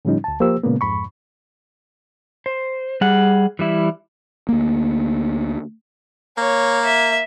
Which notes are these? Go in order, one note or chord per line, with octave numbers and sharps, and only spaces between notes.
A2 D3 F3 G3 C#4 D#4
D2 A5
F3 A#3 G4 C5 E6
A#2 C#3 G#3 A#3 B3
F2 G#2 B5 C#6
C5
G3 G#4 F#5
E3 G3 E4
D2 A#3
A#3 C#5
E5